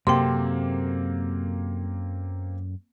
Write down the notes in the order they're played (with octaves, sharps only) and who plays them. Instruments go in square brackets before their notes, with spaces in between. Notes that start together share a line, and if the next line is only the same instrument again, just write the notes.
[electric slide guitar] F#2 F#4 A4 [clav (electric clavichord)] C3 [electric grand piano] A#3 C4 [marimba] G5 C6